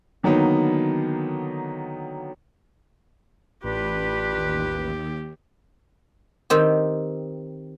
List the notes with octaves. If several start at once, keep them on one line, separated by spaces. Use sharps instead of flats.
D3 D#3 F#3 A#3 B3 D#4
A1 D4 F4 G4 B4
D#2
D#3 C4 G4